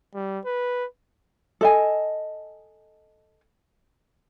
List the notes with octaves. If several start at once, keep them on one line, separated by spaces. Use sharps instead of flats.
G3
B4
A4 D#5 G#5